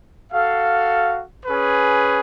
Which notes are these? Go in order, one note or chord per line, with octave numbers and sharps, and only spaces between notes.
F#4 A4 F5
C#4 G#4 B4